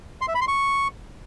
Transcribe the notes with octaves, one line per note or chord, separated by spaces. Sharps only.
C6
E5
B5
C6
C#6